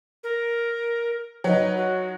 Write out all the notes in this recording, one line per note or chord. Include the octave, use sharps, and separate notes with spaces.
A#4
F#3 D#4 B4
F#4